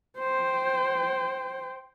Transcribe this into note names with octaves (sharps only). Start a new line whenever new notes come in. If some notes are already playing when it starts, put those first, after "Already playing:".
C5 G5